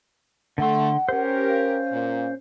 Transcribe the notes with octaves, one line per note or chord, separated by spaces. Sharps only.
D3 A3 F#5 C6
C#4 G4 A#4 C5
F5
A#2